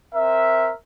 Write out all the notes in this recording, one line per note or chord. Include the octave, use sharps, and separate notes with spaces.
C4 A#4 E5